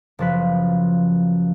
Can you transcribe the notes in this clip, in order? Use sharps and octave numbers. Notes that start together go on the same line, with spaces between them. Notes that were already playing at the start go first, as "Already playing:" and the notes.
F#1 F3 B4